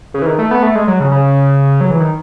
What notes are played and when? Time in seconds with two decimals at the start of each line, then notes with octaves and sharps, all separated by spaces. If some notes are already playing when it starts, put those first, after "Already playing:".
0.14 C#3
0.22 E3
0.26 D#3
0.39 A3
0.51 B3
0.63 A3
0.75 G#3
0.88 F#3
1.00 C#3
1.12 C#3
1.81 F#3
1.91 E3
2.00 D#3